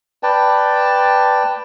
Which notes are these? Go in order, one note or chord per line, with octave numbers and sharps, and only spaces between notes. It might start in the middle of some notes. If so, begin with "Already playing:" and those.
B4 D5 G5 A5